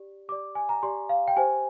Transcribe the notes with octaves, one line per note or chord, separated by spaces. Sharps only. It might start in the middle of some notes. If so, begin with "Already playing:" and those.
Already playing: G4 D5
G4 D5 D6
G#5
A#5
G4 D5 C6
F5
G5
G4 C5 G#5